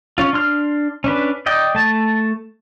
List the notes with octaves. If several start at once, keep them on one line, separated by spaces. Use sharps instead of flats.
C#4 F4
D4 C6 F6
C#4 D4 B4
D5 D#5 G5
A3 A5